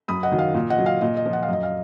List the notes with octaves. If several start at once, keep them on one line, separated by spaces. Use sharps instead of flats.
F#2 B5 D#6
D#5 F#5
D#3 F#3
F5
A#2
D#5 F#5
F#3
F5
A#2 D#5
D#5
F3
F#5
F5
F#2 D#5
F5